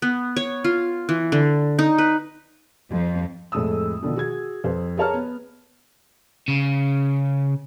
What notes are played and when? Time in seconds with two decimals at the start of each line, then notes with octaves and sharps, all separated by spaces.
0.02 B3
0.36 C#5
0.64 F4
1.09 E3
1.32 D3
1.79 D#4
1.98 B4
2.91 F2
3.52 F2 A2 G#3 A4 D#6 E6
4.03 B2 D3 D#3 F3
4.16 F#4 G#4 G#6
4.64 F2 C5
4.98 G#4 A#4 C#5 A5 A#5 F6
5.14 B3
6.48 C#3